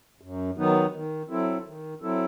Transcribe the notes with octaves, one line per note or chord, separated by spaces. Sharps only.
F#2
D#3 F#3 B3 D#4
D#3
F#3 C4 E4 A4
D#3
F#3 C4 E4 A4